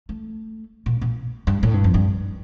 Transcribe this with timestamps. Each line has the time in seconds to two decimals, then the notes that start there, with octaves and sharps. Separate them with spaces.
0.09 A3
0.86 A#2
1.01 A#2
1.47 G2
1.63 A2
1.74 G2
1.84 F2
1.94 G2